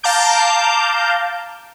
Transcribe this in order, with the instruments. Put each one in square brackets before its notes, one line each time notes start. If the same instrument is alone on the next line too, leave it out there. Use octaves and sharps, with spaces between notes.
[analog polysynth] F5 A5 A#5 D6 G6 D7